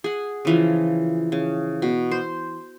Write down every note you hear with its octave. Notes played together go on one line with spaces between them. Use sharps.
G#4 F#5
C#3 E3 F3
C#3
B2
C5